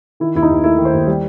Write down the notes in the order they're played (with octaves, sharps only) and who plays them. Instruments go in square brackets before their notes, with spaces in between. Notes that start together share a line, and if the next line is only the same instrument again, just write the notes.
[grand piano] D#3 E4
D#2 E4
D#4
D#2
A3 E4
D#3
C5
D#2
G3